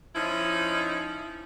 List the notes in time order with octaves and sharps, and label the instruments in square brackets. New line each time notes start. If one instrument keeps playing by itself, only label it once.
[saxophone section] F3 C#4 D#4 E4